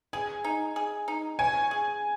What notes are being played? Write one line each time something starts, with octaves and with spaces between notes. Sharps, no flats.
G#4 G#5
D#4
G#4
D#4
C#5 G#5
G#4